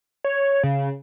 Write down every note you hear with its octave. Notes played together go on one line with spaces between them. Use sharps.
C#5
C#3